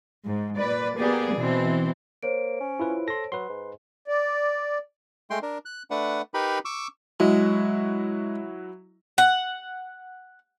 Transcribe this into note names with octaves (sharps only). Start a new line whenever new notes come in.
G#2
A#2 B4 D5
A#3 B3 G4 G#4 D5
B2 E3 C4
A#3 C5 C#5 D7
C#4
E4 F4 B4
A4 C6 A#6
F#3 B4 C6
G#2
D5
G#3 A3 G5 C6
D4 A#4
F#6
A3 D4 B4 F#5
D#4 G4 A#4 B4 B5
C#6 D6 E6
F#3 G#3 E4 F#4
F#5